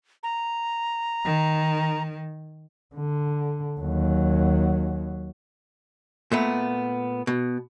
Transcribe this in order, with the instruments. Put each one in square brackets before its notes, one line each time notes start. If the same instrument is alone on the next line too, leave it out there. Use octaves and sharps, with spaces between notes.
[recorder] A#5
[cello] D#3
[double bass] D3
D#2 F#3
[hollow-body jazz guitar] A#2 A3 B3
B2